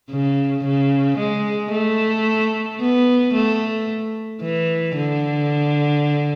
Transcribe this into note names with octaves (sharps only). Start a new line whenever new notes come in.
C#3
C#3
G#3
A3
B3
A3
E3
D3